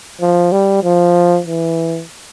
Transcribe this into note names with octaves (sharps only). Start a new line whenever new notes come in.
F3
G3
F3
E3